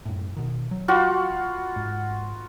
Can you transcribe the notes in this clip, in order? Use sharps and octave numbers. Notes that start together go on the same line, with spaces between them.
F#2 A2
B2 D#3
F#3
F4 F#4 B5
G#2